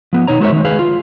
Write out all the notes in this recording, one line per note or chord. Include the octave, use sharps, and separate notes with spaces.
F3 B3
B2 D#3 D#4 C#5 A#5
G#3 F#4 A#4 C5 C#5 E5
D#3 G#3
G#4 B4 F5
F4